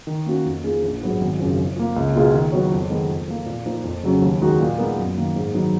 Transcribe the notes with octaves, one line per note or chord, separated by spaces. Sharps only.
D#3
A#3 C#4 F#4
F2
F3 A#3 D#4 G#4
A#1
G#2 F#3 B3 D#4
G#1
F#2 C#3 F3
F3
A#3 F4
C#2
B2 A#3 F4 G#4
D#3
F#3 B3 F#4 C#5
F2
D#3 G#3 B3
F2
F3 A#3
A#2
F3 A#3 D#4
F2
C#3 F#3 C#4
D#2
D#3 G#3 D#4 F#4
A#2
G#3 B3 D#4 A#4
F#2
D#3 A#3
G#2
D#3 F#3 B3 D#4